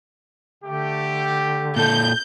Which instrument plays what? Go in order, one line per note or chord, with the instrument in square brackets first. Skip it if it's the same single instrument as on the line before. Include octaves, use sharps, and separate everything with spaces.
[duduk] D3 [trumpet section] A3 G4
[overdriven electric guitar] A#2 A4 [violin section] G6